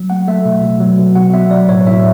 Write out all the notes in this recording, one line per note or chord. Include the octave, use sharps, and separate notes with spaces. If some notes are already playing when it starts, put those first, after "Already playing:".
Already playing: F#3
A3 F#5
A3 E5
B2
B2
F#3
B2
B2 F#5
B3 E5
F#3 D5
A2 C#5
A2 E5